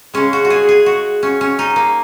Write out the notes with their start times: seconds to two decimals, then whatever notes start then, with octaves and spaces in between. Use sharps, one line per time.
0.14 C#3 G#3 C#4
0.33 F#4
0.45 F#4
0.50 G#4
0.69 G#4
0.86 F#4
1.23 C#4
1.41 C#4
1.59 D#4
1.76 A#3